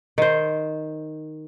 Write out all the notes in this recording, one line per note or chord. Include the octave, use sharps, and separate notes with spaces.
D#3 C5